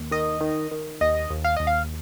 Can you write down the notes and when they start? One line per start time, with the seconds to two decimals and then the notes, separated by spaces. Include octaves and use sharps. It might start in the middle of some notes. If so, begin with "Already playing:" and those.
Already playing: D#2
0.11 D#3 D#5
0.41 D#3
0.71 D#3
1.01 D#2 D#5
1.30 D#2
1.44 F5
1.56 D#2 D#5
1.67 F5